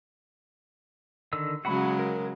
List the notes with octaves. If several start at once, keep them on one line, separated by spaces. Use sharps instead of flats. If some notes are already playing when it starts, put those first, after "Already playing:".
D3 D#3 E6
C#3 F#3 G#3 F#4 F#5 B5
A#4